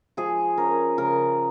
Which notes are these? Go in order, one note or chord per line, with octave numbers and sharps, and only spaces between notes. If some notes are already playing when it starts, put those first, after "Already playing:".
F3 G#4
C#4 A#4
C#3 A#4